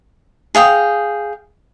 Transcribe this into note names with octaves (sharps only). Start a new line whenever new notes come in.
G#4 F5 G5 D#6